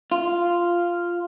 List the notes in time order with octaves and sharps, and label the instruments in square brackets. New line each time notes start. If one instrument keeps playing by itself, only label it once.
[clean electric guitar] F4